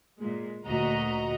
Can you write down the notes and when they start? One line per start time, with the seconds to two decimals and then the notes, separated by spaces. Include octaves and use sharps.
0.19 A#2 G#3
0.65 D2 A#2 F#4 D#5 A#5